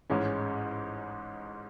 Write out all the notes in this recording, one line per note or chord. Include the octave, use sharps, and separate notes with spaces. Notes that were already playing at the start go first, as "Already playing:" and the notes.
A1 G#2 G#3 C#4